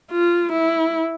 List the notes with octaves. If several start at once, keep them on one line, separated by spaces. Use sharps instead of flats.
F4
E4